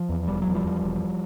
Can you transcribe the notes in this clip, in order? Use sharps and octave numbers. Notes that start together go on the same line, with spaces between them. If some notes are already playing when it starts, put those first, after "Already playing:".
Already playing: F3
E2
E1 G3
E2 F#3
F3 G3
E2
E1